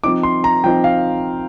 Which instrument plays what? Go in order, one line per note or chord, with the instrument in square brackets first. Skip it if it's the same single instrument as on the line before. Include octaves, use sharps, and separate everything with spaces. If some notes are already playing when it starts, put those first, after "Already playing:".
[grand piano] F3 C4 D#4 D6
C6
A#5
F3 C4 D#4 G5
F5